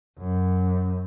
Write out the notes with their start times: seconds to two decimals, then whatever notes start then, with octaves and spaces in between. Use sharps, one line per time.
0.19 F#2